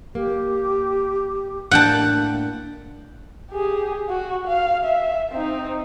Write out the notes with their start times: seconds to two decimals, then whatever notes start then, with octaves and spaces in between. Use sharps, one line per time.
0.15 A#3 G4
1.71 A2 A#3 D4 F#5 G5 A5
3.51 G4 G#4
4.10 F#4
4.47 F5
4.84 E5
5.32 C4 D#4